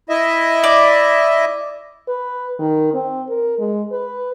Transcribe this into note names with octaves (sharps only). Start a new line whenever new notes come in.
E4 D#5 E5
D5
B4
D#3
C4
A#4
G#3
B4